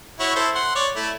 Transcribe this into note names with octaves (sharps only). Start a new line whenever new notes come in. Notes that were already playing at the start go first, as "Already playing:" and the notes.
E4 F#4 C#5
E4 A4 C5
F#5 C6
C#5 D5
A3 E4